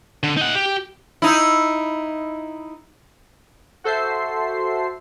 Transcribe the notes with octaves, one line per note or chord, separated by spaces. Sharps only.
D3
D#4 F#5
G4
D#4 E4
F#4 A4 C5 E5 C7